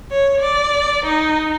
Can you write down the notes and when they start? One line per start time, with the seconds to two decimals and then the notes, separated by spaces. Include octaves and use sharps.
0.10 C#5
0.39 D5
1.04 D#4